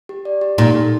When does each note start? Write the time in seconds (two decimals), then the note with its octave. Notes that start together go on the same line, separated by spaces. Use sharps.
0.09 G4
0.25 D5
0.41 G4
0.58 A#2 D#4
0.75 A4